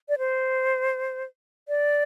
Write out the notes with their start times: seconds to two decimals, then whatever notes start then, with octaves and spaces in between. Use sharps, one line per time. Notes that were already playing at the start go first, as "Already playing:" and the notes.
0.09 D5
0.18 C5
1.68 D5